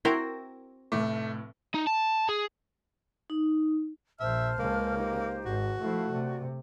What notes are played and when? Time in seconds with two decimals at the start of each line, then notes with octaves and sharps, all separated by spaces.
0.05 C4 E4 F#4 A#4 C5
0.92 F1 A2 A3 D6
1.74 D#4
1.87 A5
2.29 G#4
3.30 D#4
4.20 A#1 C5 E5 A5 F6
4.59 C#2 C#3 A#3
4.98 D#4 G4 C5
5.46 G#1 G#2 F#4
5.82 F3 A3 E4 C5 F5
6.12 C3 D5